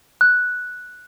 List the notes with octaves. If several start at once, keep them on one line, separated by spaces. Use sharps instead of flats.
F#6